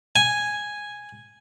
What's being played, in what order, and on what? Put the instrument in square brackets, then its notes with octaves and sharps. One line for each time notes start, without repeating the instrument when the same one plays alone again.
[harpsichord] G#5